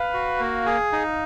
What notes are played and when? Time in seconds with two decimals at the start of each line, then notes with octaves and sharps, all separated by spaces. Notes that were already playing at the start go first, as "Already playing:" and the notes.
Already playing: B4 F5
0.14 F#4
0.40 A#3
0.66 G#4
0.93 D#4